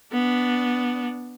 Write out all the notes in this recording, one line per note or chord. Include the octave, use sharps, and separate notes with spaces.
B3 D4